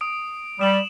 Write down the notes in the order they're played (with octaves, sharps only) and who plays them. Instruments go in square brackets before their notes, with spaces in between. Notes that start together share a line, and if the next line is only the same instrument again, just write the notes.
[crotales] D#6 D7
[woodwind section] G3 [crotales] D#6 E7 F#7